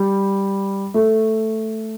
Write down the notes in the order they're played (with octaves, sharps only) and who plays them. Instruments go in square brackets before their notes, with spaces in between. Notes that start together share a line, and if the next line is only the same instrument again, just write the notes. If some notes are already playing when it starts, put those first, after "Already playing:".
Already playing: [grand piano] G3
A3